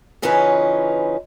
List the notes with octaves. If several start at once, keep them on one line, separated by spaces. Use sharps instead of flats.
C#3 E3 C#4 D#4 F4 B4